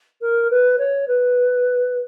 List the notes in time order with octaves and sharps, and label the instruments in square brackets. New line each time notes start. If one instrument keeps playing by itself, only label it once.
[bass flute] A#4
B4
C#5
B4